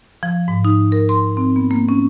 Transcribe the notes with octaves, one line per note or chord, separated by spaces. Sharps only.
F3
G#2
D#4
A#4
C6
C4
B3
A#3
C#4